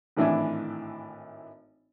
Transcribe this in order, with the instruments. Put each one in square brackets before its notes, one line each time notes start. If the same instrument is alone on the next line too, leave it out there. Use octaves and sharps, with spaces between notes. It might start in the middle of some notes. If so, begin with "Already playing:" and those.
[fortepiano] G#1 A2 E3 D4 E4 G#5